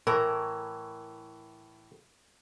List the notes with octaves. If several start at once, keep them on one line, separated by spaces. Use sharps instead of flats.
A2 E3 A#4